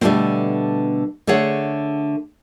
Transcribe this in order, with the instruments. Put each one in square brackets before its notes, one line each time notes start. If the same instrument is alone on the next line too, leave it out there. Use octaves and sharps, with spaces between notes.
[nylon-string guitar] B2 D3 G3 A3 B3 C4
D3 A3 G#4 C#5 F#5